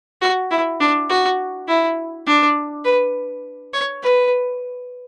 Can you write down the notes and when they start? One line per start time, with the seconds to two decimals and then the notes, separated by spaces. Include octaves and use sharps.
0.21 F#4
0.50 E4
0.80 D4
1.09 F#4
1.67 E4
2.27 D4
2.85 B4
3.73 C#5
4.02 B4